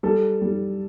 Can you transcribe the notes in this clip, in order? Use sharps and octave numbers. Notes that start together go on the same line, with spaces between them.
G3 A4
G3